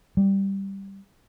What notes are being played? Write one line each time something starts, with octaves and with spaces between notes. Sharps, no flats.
G3